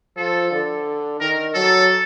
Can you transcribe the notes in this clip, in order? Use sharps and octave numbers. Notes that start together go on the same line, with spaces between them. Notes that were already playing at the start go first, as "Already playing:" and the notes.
F3 A4
D3
D#3 A#4
F#3 A4